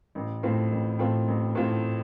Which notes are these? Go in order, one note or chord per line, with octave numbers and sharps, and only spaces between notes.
A1
A2 A3 C4 F4
A1
A2 A3 C4 F4
A1
A2 A3 C4 F4